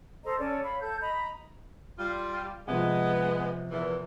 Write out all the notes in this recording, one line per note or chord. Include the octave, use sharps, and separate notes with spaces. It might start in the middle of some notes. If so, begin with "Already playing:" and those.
A4 C5 D#5 A#5
C#4 A4 C#5 D5
C#5 F5 B5
A4 G6
D#5 A#5 B5
G3 F4
C3 F3 G#3 B3
E2 A#2 E3